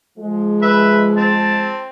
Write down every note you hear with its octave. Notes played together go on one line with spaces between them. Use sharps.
F3 G#3
B4 E5
C4 A5